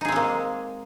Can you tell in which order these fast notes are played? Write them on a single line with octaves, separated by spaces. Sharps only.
D#4 G#4 C4 G#3 A#3